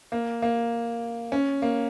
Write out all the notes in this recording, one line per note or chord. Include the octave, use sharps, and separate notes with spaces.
A#3
A#3
C#4
A#3